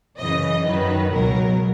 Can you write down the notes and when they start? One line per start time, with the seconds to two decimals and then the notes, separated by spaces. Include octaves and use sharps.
0.18 F#2 C#3 E3 D#5
0.66 F#2 D#3 F#3 B4
1.13 C#2 B2 F#3 A#4